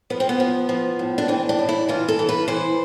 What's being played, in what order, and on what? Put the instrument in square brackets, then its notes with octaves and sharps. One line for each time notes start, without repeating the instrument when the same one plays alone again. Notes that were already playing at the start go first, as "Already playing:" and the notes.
[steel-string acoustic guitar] F3 B3
C4
B3
F3
F3
A2
D4
E3 C4
D4
A2
E4
E3 F4
A4
E3
B4
E3 C5